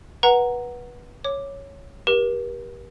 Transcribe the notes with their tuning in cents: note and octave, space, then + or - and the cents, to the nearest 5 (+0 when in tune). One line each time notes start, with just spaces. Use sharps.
B4 -20 F#5 +0 A#5 +0
C#5 +0 D6 +0
G4 +0 A#4 +45